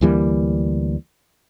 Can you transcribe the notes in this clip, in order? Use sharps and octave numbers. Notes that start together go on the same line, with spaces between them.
D2 E3 G3 A#3